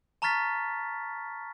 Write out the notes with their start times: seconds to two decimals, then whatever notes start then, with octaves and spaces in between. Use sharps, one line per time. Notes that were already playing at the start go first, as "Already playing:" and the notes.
0.22 A5 A#5 C#6 F6 A6 B6